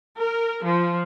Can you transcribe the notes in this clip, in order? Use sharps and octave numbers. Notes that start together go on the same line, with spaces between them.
A#4
F3